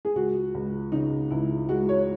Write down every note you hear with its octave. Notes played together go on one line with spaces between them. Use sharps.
G#4
C#2 F#4
C#2
C#3 D#4
C#2 E4
G#3 F#4
C#5